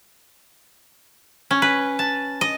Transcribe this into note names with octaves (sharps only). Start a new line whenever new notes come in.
C#4
B4
A5
D#5